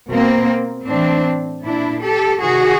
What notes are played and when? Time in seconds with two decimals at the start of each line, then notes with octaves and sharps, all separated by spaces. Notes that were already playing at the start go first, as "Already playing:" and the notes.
0.11 B2 A#3 C4
0.88 A2 E3 C4 D4
1.64 A#2 D4 E4
2.02 G4 A4
2.40 C3 D#3 F#4 G#4